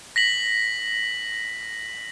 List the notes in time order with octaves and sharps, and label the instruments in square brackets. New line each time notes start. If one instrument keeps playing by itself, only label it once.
[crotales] A#6 B6 F#7